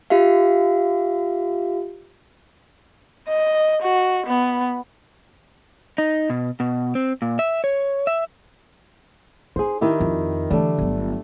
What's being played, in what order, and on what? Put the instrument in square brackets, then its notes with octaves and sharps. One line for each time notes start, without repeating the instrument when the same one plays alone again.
[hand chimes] F4 G4 E5 F5
[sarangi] D#5
F#4
B3
[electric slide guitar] D#4
B2
B2
C4
A#2
E5
C#5
E5
[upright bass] D#4 [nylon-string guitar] G#4 C5
[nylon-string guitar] D#3 E4 G4
[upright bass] F2
[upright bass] D3 E3 [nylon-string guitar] G3 A3 D4
[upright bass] G1 F#3